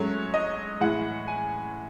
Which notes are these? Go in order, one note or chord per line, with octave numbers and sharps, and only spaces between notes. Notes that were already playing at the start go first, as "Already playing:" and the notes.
Already playing: G#2 F#3 A3 C#4 C#5
D#5
A2 E3 G#3 F#5
G#5